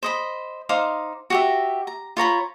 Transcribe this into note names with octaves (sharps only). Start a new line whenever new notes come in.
C5 D#5 B5
D#4 C5 F5 D6
F#4 G4 E5
A#5
F4 C#5 A#5 B5